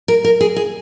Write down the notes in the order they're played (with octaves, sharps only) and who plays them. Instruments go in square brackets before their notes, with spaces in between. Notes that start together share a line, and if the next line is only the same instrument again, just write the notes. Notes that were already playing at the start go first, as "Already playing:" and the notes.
[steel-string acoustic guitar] A#4
A#4
G#4
G#4